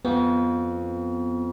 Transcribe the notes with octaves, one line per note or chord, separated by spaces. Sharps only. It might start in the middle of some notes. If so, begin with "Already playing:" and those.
F2 B3